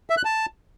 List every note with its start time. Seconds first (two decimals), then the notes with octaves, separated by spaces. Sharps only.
0.10 E5
0.17 F#6
0.25 A5